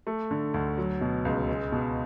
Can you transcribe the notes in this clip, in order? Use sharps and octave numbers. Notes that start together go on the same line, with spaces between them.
A3
D3
D2
F#3
B2
C#2
G#3
B2